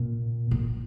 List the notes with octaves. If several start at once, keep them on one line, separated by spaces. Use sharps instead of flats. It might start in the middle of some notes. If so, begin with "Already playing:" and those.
Already playing: A#2
A#2